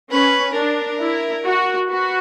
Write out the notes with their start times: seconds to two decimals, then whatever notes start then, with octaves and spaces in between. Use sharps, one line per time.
0.10 C#4 B4
0.55 D4 A#4
1.00 E4
1.45 F#4
1.90 F#4 B4